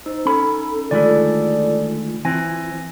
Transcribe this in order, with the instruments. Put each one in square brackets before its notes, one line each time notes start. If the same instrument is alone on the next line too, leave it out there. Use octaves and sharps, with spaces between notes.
[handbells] D#4 [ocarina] C5
[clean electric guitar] C#4 B5 [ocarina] A4
[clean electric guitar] D2 D#3 G#3 [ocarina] F4 [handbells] A4 D5
[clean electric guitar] E3 C4 [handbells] G#5 A#6